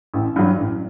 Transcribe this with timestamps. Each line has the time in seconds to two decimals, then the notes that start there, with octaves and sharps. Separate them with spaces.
0.14 A1
0.36 G2 F#3
0.58 A1